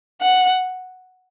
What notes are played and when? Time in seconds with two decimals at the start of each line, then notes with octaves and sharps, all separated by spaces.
0.22 F#5